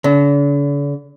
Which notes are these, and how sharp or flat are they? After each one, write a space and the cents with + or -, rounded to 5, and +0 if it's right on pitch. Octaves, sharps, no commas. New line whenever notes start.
D3 -45